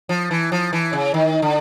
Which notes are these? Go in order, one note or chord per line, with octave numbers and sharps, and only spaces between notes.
F3
E3
F3
E3
C#3
D#3
D3